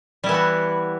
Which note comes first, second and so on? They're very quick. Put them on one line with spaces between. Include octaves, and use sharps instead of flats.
G3 E4 E3 B3 F#4